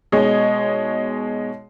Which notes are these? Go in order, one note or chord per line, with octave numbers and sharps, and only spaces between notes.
B2 G#3 D#4 G#4 C#5 D#5